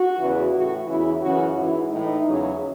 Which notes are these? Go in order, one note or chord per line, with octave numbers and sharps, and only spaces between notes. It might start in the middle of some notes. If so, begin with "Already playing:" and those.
Already playing: F#4
E2 C#3 E3
A2 E3 F#4
E2 C#3 E3 E4
F#2 C#3 E3 F#4
G#2 E3 E4
A2 E3 D#4
E2 C#3 F#3